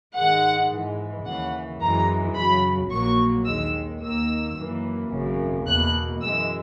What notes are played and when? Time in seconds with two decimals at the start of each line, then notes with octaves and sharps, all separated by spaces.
0.16 G#2 D#3 G#3 F#5
0.71 G#2 E3 G#3
1.25 D#2 C#3 E3 F#5
1.81 F#2 E3 G#3 A#5
2.35 F#2 C#3 F#3 B5
2.91 A#1 A#2 F#3 A#3 C#6
3.45 D#2 D#3 G#3 E6
4.02 D#2 D#3 A#3 E6
4.57 F#2 E3 A#3
5.12 G#1 F#2 C#3
5.66 E2 B2 A#3 F#6
6.21 F#2 E3 G#3 E6